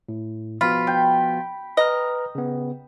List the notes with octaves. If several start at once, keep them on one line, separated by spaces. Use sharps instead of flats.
A2
F3 B3 F4 F#4 B5
G5
B4 D#5 A#5 F6
C#3 B3